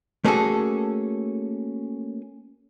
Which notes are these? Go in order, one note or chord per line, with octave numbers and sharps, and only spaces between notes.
A3 A#3 C#4 F#4 G#4 A4